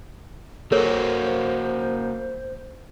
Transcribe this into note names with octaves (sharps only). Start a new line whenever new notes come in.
A#3 F#4 A4 A#4 C5 C#5